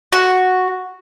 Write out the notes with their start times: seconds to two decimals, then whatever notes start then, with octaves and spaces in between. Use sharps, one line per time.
0.13 F#4